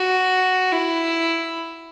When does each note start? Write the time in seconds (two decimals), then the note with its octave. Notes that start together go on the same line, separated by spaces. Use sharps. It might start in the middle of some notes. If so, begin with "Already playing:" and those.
Already playing: F#4
0.72 E4